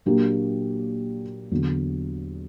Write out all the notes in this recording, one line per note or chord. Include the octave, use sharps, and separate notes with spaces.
A#2 F#3 A#3 D4 G4
E2 D3 F#3